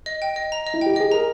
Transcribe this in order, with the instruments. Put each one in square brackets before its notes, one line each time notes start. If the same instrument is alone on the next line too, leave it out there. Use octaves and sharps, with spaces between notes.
[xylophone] D#5
G5
D#5
A#5
D#5
[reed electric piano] E4
[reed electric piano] G4 [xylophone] G5
[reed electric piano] G#4 [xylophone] D#5
[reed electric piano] A#4 [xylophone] A#5